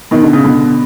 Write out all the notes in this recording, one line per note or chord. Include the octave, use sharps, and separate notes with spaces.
B2 D#3
D3
C#3
B2 D3